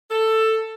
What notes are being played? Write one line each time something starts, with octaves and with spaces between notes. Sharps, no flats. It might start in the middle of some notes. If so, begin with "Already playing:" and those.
A4